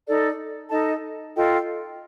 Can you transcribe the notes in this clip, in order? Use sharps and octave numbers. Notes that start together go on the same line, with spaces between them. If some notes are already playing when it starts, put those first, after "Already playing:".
D#4 A4 D5
D#4 A4 D#5 A5
F4 A4 D#5 G5